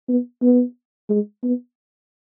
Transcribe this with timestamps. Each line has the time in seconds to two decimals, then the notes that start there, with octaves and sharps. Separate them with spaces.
0.09 B3
0.42 B3
1.10 G#3
1.43 B3